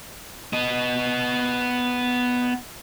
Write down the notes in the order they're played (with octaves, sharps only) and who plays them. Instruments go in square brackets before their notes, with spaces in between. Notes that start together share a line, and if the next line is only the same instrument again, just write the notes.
[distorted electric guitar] B3 D#5